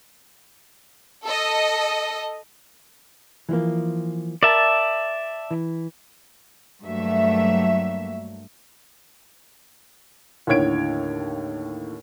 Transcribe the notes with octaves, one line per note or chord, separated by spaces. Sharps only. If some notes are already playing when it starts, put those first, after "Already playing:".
A4 D#5
E3 F3 A#3
A#4 D5 E5 A5
E3
G2 F#3 A3 A#3 E5
D#2 A2 D3 C#5 G#6 D7